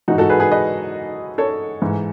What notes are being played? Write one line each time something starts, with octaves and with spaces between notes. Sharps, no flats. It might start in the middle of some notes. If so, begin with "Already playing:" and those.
G#2 E3 D#4 F#4
F#4 A4
G#4 B4
G#4 B4
B4 D#5
A4 C#5
G#2 E3